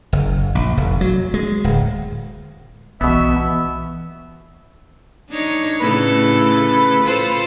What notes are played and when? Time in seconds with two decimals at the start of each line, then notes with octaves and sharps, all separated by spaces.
0.13 F#1
0.55 A#1
0.77 F1
1.01 F#3
1.34 G#3
1.64 D1
3.01 B1 B2 E3 B3 E5
5.30 D4 D#4 C#5
5.80 A2 C#3 A4 B4
7.03 F4 A4 C5